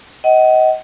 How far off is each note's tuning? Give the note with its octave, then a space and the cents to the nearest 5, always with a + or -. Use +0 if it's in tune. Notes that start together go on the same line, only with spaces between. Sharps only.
D#5 +20 F#5 +30